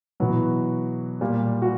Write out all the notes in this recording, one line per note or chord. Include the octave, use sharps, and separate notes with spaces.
B2 E3 F#3 E4
A#2 G3
F#4